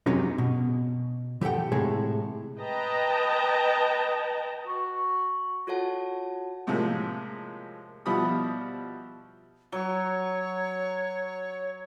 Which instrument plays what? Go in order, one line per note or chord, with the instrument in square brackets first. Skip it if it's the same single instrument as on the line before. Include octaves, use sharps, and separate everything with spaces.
[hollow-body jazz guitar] F#2 C3 F#3 G#3 C#4 D#4
B2
E3 G4 A4 F#5 G5
A2 C3 G#3 G#4 A4
[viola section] B4 D#5 G5 A5 A#5
[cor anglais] F#4
[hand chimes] F4 F#4 A4 C#5 F#5 A5
[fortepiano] A2 C3 F3 G#3 A#3
B2 F3 G3 E4 B5 D#6
[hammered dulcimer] F#3 [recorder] C#5